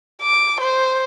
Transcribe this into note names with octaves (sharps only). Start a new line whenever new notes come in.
D6
C5